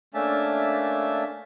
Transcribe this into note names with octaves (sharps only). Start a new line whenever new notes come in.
A3 A#3 C#4 D4 E5 A5